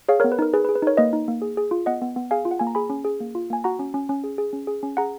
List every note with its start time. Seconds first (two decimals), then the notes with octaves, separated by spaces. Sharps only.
0.09 G#4 C#5 F5
0.20 B3 A#4 C#5
0.32 B4
0.39 D#4 A#4
0.54 G#4 B4
0.65 B4
0.69 G#4
0.76 B4
0.82 D#4 A#4 C#5
0.97 A#3 B4 D#5
1.13 D#4
1.28 A#3
1.42 G#4
1.57 G#4
1.71 F4
1.86 B3 D#5 F#5
2.02 B3
2.16 B3
2.31 G#4 F5 G#5
2.45 F4
2.51 F#5
2.60 A#3 G#5
2.67 A#5
2.75 G#4 G#5 B5
2.90 C#4
3.04 G#4
3.20 A#3
3.35 F4
3.50 A#3 G#5
3.64 F#4 F#5 A#5
3.79 C#4
3.94 C#4
4.09 C#4
4.24 G#4
4.38 G#4
4.53 C#4
4.67 G#4
4.83 C#4
4.97 G#4 F#5 A#5